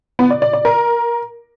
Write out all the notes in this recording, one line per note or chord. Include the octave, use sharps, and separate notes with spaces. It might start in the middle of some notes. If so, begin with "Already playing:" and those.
B3
D5
D5
D5
A#4